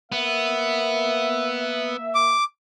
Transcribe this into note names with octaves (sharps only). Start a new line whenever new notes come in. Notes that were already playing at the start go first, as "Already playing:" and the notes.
A#3 B3 E5
D6